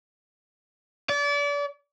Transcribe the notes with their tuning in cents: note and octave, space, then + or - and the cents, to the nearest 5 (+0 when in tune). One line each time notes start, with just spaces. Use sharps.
D5 -35